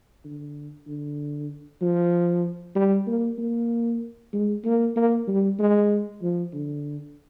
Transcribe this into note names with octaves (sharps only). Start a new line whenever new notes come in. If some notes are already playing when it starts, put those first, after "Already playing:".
D3
D3
F3
G3
A#3
A#3
G#3
A#3
A#3
G3
G#3
F3
D3